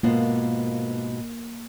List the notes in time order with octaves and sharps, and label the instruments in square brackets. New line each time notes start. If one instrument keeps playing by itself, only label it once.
[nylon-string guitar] G#2 B2 F4 [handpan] A#3